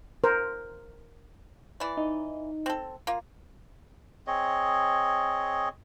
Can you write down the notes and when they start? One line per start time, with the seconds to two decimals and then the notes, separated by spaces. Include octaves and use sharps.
0.24 A#4 C5
1.80 E3 D5
1.97 D#4
2.66 C4 A4
3.07 A#3 F4
4.27 C4 G#4 C#5 D#5